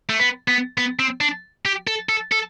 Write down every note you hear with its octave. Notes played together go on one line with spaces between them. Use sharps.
A3
B3
B3
B3
C4
D4
G4
A4
A4
A4